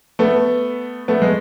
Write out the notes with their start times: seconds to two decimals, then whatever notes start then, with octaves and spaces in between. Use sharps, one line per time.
0.19 A3 B3
1.08 A3 B3
1.22 G#3